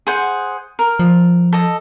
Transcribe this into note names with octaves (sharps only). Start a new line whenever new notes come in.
G#4 C5 F#5
A#4
F3
A4 D#5